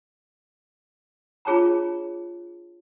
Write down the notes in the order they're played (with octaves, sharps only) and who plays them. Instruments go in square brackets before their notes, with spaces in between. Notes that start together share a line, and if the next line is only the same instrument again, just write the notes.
[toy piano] D4 F4 G#4 C#5 A5 A#5